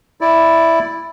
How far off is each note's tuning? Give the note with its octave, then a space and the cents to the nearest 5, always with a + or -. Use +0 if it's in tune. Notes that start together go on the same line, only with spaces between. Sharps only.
E4 +0 D5 +0